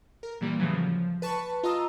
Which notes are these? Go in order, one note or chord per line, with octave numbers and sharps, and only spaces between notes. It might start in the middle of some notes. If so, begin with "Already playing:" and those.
A#4
A#2 E3 G3 A#3
A2 C#3 E3 F#3
F3
B4 A5 C#6
F4 D#5 A5 A#5 D#6 E6